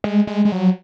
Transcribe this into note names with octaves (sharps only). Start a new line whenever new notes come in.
G#3
G#3
G#3
F#3